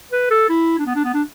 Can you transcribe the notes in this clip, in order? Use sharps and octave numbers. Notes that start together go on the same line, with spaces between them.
B4
A4
E4
D4
B3
D4
B3
D4